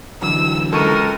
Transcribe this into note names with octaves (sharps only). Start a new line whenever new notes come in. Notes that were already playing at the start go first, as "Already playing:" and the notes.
D3 E3 F#3 E6
C#2 A4 A#4 C#6 D#7